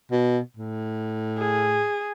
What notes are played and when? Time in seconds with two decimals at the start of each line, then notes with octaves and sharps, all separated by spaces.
0.11 B2
0.57 A2
1.38 G#4